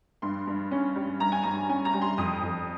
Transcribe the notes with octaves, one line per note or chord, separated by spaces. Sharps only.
G2 C6
G2
C#4
G3
G2 A#5
G#5
G2 A#5
C#4 G#5
A#5
G3
C6
F2 D#6
F2